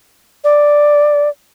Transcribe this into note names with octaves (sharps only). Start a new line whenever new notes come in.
D5